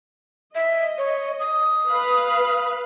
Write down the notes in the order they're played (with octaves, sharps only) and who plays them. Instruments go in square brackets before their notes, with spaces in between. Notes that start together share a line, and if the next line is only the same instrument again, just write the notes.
[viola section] D#5 [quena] E5
[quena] C#5
D#6
[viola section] B4 F5 B5